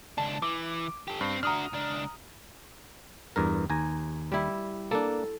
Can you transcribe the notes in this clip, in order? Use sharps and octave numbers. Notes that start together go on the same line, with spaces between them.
C#2 D4 A5
E3 D6
G4 A4
G2 C4
D4 F#4 A#5 D#6 F6
C#2 D4
E2 G2 A#4
D#2 G#5 A#5
G3 E4
A#3 D4 A4